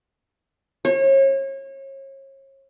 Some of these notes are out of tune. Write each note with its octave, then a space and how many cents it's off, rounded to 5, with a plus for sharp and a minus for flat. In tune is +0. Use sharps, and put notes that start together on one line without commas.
C#5 -35